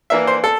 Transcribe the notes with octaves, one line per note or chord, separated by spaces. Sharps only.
E3 A#3 D4 E5
C5
A4